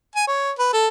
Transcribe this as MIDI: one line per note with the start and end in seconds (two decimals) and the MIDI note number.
0.16 0.27 80
0.27 0.51 73
0.59 0.68 71
0.73 0.88 69